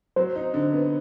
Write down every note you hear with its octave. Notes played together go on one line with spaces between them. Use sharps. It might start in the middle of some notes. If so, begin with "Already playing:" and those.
F#3 C5
D#4
D3
B3